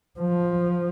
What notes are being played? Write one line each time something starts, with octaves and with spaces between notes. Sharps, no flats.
F3